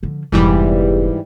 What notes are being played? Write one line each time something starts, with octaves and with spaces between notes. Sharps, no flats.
D3 F3
F1 G#2 E3 G3 B3